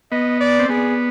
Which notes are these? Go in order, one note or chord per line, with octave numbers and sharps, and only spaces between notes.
B3 D#5
D5
C4
B3 G#4